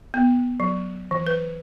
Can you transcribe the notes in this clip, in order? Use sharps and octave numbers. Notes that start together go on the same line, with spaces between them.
B3
F#3
E3
B4